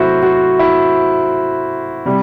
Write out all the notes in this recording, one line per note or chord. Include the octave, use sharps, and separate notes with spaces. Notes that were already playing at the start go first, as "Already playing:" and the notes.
Already playing: C3 F#3 A3 E4 F#4 C5
F#4
E4
C3 G3